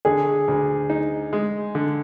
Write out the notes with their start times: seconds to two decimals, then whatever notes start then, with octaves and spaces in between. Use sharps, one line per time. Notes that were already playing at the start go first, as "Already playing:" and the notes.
0.05 D3 G#4
0.48 D2
0.90 D#4
1.33 G#3
1.75 D3